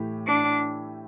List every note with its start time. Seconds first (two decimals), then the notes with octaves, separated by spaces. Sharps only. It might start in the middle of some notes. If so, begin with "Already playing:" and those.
Already playing: A2 E3 A3 E4 G4
0.27 D4